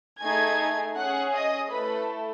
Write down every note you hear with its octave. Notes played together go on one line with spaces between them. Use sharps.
A3 D#4 G#4 G#5 G#6
C#4 G#4 F#5 F#6
D#5 D#6
A3 E4 A4 B4 B5